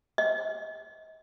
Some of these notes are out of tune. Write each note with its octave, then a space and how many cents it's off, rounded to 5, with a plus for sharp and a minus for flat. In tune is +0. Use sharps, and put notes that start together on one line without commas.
D#5 +35